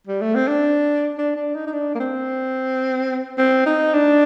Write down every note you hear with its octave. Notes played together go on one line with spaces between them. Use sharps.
G3
A3
C4
D4
D4
D4
D#4
D#4
D4
A#3
C4
C4
D#4
D4